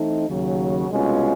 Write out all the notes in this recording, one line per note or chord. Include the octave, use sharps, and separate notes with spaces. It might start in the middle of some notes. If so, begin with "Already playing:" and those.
Already playing: E3 A3 C4 D#4
D#2 C#3 F#3
C2 B2 G#3 C#4 F4